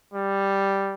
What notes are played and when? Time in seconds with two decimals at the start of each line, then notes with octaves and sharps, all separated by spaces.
0.14 G3